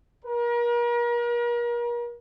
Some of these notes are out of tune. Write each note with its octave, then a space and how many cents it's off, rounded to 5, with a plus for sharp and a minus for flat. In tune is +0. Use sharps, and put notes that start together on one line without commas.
A#4 +40